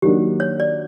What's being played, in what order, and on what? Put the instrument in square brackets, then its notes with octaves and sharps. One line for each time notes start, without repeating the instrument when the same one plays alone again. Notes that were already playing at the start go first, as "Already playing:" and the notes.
[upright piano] D#3 F#3 A#3 D4 [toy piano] G4
[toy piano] C#5
D5